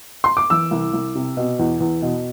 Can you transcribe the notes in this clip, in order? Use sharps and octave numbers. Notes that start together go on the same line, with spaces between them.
C6
D6
E3 E6
C2
C2
C3
B2
E2
E2
B2